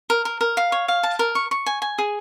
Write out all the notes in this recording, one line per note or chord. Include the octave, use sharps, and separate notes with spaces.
A#4
A#4
A#4
F5
C#5
F5
A5
A#4
C#6
C#6
G#5
G#5
G#4